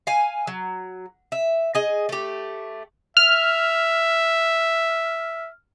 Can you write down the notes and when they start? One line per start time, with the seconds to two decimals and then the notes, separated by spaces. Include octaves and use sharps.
0.07 F5 G#5
0.47 F#3
1.32 E5
1.75 G#4 D#5
2.09 A3 G4
3.17 E5 F6